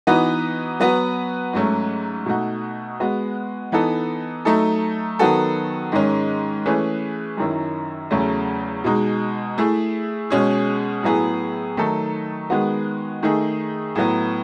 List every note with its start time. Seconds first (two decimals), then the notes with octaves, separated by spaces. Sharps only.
0.07 E3 B3 D#4 F#4 B4
0.80 F#3 B3 F#4 B4
1.53 G#2 F#3 A3 C#4
2.26 B2 A3 D#4 F#4
3.00 G#3 B3 F#4
3.72 E3 B3 D#4 A4
4.45 F#3 A3 D#4 A4
5.19 D#3 F#3 B3 F#4 A4
5.92 G#2 D#3 G#3 C#4
6.65 E3 A3 C#4 G#4 B4
7.37 F#2 D#3 F#3 C#4 E4
8.11 E2 C#3 F#3 A3 C#4
8.84 B2 G#3 D#4
9.58 A3 E4 G#4
10.30 B2 G#3 C#4 G#4
11.03 A2 F#3 B3 E4 G#4
11.77 D#3 F#3 A3 D#4 A4
12.50 D#3 G#3 B3 F#4
13.23 D#3 A3 D#4 G#4
13.95 A2 F#3 B3